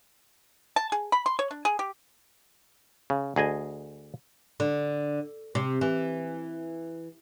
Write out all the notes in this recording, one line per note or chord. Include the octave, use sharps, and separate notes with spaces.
A5
G#4
B5
C6
C#5
D4
G#4
G4
C#3
D2 G#4 D#5 G#5
D3
C3
E3